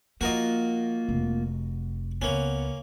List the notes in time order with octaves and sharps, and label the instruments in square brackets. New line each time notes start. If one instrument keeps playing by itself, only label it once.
[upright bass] F3 [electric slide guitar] A#3 F4 [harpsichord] F#4 A#4 D#5
[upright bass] F1
[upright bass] C#2 [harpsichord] A#3 C#4 [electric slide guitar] B3